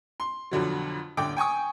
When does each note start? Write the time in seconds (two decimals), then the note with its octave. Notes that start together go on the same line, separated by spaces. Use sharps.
0.20 C6
0.51 F2 B2 D3 F#3
1.17 D#1 D3 G5 D6
1.37 G5 G#5 C#6 D#6